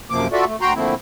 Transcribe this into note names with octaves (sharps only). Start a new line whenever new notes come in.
F#2 C3 F3 A#3 D6
F4 F#4 A4 D5 E5
A3
D2 F#4 G5 A#5 C6
D3 F3 A3 A#3 C4 E4